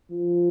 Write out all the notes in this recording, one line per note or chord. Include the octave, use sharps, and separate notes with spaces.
F3